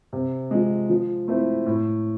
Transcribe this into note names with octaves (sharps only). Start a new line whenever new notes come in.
C3
F3 G#3
F3
A3 C4 E4
A2